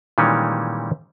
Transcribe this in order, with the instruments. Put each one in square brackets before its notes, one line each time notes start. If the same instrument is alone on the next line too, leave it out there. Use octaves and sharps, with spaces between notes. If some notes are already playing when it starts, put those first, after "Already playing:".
[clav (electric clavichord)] A#2 D#3 E3 G3 G#3 C#4